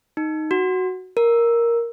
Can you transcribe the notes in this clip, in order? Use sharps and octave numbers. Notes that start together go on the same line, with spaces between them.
D#4
F#4
A#4